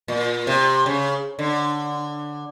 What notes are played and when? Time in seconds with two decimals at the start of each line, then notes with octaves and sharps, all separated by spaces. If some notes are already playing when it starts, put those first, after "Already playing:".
0.08 A#2
0.47 C3
0.86 C#3
1.39 D3